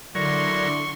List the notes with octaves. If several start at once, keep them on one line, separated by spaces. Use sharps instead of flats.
D3 F#3 E4 A#4 D5 C6 C#6